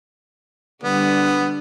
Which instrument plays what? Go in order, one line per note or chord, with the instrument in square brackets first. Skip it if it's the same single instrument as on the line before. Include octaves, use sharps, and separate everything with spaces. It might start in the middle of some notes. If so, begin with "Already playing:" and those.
[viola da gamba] D3 G3 [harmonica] B3